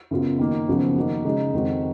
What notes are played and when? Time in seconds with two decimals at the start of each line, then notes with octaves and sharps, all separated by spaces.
0.11 F#2 C#3 F#3 B3 F4
0.39 D#3 A#3 D#4
0.67 F#2 C#3 F3 B3 F#4
0.96 D#3 A#3 D#4 F#4
1.25 C#3 G#3 D#4 F#4
1.54 F2 D#3 G#3 D#4 F#4